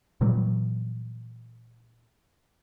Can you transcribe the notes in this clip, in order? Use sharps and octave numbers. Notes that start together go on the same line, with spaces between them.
A#2 E3 F#3 G3